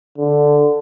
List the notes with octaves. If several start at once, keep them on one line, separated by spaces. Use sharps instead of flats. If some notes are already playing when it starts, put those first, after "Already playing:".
D3